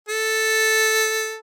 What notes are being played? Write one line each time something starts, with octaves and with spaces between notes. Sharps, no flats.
A4